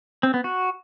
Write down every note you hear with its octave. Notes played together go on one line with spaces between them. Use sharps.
C4
B3
F#4